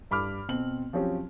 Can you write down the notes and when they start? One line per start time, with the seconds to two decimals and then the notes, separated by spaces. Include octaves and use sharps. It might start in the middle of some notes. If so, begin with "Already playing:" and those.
0.11 G2 B5 D6 F6
0.49 B2 C4 F#7
0.93 F3 F#3 C4 C#4 G4